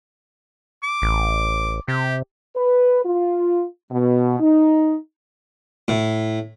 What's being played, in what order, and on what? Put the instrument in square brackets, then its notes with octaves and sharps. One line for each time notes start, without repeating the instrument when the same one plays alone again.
[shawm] D6
[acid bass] A1
[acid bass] C3 [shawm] G4
[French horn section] B4
F4
B2
D#4
[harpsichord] A2